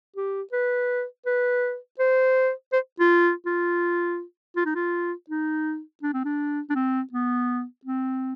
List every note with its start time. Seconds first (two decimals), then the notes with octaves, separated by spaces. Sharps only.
0.16 G4
0.53 B4
1.26 B4
1.99 C5
2.73 C5
3.00 F4
3.46 F4
4.56 F4
4.66 D#4
4.75 F4
5.30 D#4
6.03 D4
6.13 C4
6.25 D4
6.70 D4
6.75 C4
7.13 B3
7.85 C4